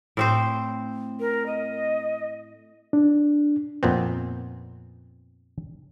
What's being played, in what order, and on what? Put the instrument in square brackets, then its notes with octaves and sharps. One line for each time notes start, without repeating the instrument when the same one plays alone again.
[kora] A2 C4 C5
[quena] A#4
D#5
[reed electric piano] D4
[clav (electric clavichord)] F2 A#2 B3 C4